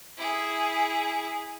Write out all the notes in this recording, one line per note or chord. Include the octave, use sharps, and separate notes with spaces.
E4 G#4